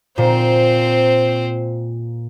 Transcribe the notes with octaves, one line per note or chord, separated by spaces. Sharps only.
A#2 C4 C5